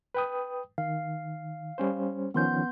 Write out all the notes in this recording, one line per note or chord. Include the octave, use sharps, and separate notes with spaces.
B4 G5 D#6
D#3 F5
G3 C#4 C5
D#3 F3 B3 C#4 C6 G6